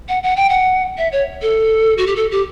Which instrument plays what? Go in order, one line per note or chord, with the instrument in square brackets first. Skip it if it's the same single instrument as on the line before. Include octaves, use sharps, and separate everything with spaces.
[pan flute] F#5
F#5
G5
F#5
E5
C#5
A4
F#4
G4
A4
G4